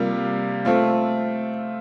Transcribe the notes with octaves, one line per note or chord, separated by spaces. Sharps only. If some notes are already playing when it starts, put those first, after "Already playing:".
Already playing: C3 G3 A#3 F4
A3 C4 F4